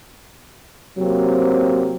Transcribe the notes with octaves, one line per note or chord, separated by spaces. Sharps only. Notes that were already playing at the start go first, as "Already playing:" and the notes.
C3 F#3 A#3 C4